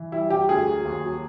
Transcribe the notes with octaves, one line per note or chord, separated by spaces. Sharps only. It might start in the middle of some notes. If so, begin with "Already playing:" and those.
Already playing: E3
G3 E4
F#3 G4
D2 G#4
F#3
D#2
F#3